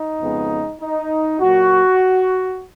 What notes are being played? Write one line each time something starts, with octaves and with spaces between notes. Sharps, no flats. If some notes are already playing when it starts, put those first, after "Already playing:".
Already playing: D#4
F2 C#3 G#3 B3
D#4
A#2 F#3 A#3 F#4